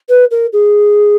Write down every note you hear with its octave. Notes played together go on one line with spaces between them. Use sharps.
B4
A#4
G#4